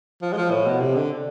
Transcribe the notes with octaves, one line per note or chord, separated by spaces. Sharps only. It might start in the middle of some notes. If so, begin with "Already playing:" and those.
F3
G#3
F3
A2
B2
C3
D3